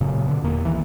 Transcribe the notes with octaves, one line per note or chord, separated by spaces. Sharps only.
F#1 A#2 C#3 F#3
B2 D3
E1 E2 A#3
E1 B1 D#3 E3